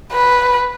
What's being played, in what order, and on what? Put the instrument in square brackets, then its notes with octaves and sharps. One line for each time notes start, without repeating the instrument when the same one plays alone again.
[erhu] B4